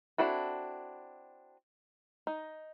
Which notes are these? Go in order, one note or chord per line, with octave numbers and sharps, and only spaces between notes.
C4 D4 E4 F#4 A4
D#4